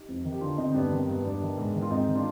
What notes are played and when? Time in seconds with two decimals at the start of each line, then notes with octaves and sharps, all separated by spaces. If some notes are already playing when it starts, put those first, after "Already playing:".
Already playing: D#4 G4
0.09 F2
0.24 D#3
0.33 G4
0.41 D3 D4 F4
0.57 D3 C4 D#4
0.71 C4
0.74 G2 B3 D4
0.91 D#3 C4
1.07 G2 B3
1.24 G2 B3 D4
1.42 D#3
1.58 G#2
1.75 D#3
1.82 F4
1.90 G#2 C4 D#4
2.07 D#3
2.15 D4 F4